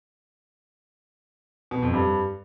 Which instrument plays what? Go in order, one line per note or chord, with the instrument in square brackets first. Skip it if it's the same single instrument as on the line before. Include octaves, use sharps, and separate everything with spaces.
[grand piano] B2
F2
G2